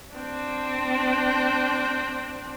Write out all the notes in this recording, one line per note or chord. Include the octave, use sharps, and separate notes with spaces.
C4 D4